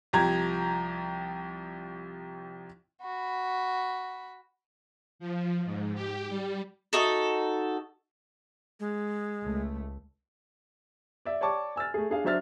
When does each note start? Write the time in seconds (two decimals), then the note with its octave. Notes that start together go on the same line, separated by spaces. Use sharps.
0.13 C2 F3 G4 A#5 G#6
3.01 F#4 B5
5.19 F3
5.65 G#2
5.94 G4
6.29 G3
6.93 D#4 F#4 A4
8.80 G#3
9.43 C#2 A3
11.25 D5 E5
11.41 C#5 D5 G5 A5 C#6 D6
11.76 G#5 E6 F6 A6
11.94 A3 G#4
12.10 D4 G#4 F5
12.24 F#3 D4 C5 E5 F6 A6